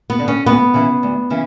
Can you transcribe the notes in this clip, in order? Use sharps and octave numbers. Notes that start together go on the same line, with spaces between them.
B3
D3
C#4
D2 B3
C#3 E3
D2
C#3 E3